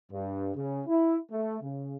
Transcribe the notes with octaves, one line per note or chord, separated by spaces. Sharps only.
G2
C#3
E4
A3
C#3